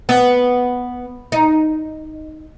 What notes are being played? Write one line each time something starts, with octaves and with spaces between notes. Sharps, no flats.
B3
D#4